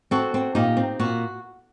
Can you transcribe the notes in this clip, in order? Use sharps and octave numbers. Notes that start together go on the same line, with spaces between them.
C4 F#4 A4
C4
A#2 D#4 G4
C4
A#2 F#4